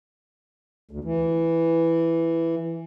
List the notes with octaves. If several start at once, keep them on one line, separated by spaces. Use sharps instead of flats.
D2
E3